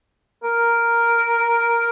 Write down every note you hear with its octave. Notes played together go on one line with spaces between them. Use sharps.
A#4